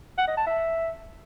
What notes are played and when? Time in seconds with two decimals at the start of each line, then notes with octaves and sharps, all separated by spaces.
0.18 F#5
0.27 D#5
0.37 A5
0.47 E5